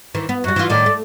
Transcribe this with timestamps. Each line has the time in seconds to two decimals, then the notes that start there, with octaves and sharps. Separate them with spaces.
0.15 D#3 E3
0.29 B3
0.44 F#2 G3 F#4
0.56 E3 F4
0.70 A2 D#3 D5
0.86 A3